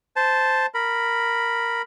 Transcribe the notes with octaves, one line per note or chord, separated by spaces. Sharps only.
C5 A5
A#4 B5